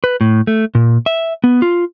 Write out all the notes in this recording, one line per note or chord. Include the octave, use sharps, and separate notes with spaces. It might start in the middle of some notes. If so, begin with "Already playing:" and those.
B4
A2
A3
A#2
E5
B3
F4